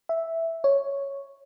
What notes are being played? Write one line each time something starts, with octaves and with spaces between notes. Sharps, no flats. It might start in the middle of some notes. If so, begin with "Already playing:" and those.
E5
C#5